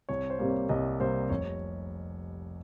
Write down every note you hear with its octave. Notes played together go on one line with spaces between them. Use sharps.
C2 C#5
C5
C3 G3 A#3
C#5
C2 D#5
C3 G3 A#3 C5
F1 C#5